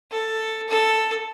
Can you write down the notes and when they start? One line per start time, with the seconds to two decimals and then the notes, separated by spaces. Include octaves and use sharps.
0.11 A4
0.69 A4